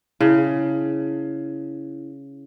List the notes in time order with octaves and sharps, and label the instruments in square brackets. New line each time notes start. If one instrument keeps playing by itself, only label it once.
[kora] C#3 [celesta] E4